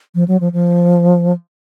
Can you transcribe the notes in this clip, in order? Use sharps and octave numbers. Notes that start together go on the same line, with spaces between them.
F3
F#3
F3
F3